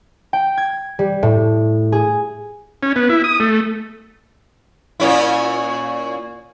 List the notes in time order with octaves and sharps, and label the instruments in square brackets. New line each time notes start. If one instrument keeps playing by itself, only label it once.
[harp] G5
G#6
G3
A2
G#4
[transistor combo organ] C#4
B3
E4
D#6
A3
[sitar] A#2 C#4 E4